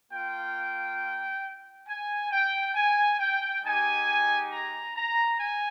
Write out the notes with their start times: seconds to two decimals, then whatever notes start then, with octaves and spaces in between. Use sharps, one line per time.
0.12 A#3 F4 G5
1.88 G#5
2.31 G5
2.75 G#5
3.19 G5
3.64 G#3 D#4 G4 G#5
4.51 A#5
4.95 A#5
5.39 G#5